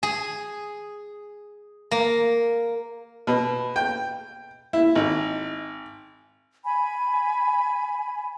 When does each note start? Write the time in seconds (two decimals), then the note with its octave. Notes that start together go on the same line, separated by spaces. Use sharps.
0.03 G#4
1.91 A#3
3.27 B2
3.76 G5
4.73 E4
4.95 G#1
6.63 G#5 B5